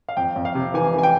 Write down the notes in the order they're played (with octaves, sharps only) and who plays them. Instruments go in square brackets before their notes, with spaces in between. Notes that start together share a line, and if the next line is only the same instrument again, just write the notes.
[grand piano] F5
F2 G5
F2
F5
C3
E3 G#5
E3
G#5
G5